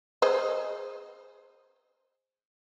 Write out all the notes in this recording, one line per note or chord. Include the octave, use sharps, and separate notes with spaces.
G#4 C5 D#5